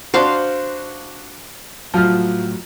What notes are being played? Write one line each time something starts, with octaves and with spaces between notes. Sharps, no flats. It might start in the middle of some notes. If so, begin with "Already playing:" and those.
D4 F#4 C5 F5 C6
A2 F3 F#3 F6